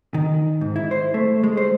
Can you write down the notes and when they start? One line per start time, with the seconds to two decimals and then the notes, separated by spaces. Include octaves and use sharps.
0.14 D#3
0.61 G#2
0.76 E4
0.91 C5
1.14 A3
1.43 G#3
1.57 C5